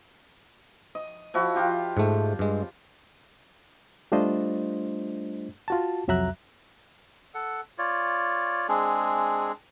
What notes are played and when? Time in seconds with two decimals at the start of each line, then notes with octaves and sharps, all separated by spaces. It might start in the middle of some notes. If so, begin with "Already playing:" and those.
0.95 D#5
1.34 F3 E4 F#4
1.56 F4 G4
1.97 G#2 A3
2.39 G2 G#3
4.12 G3 A3 D4 F4 C5 D#5
5.68 F4 F#4 A5
6.08 C2 F2 F#3 E5 A#5 F#6
7.35 A4 F#5
7.78 F4 C#5 D5
8.69 G#3 C4 D4 G#4